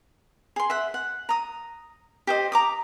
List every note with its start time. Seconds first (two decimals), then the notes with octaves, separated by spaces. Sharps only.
0.56 G#4 C6
0.70 E5 F#5
0.94 F#5
1.29 A#5 D#6
2.27 G4 C5 D#5
2.52 A#5 D6 D#6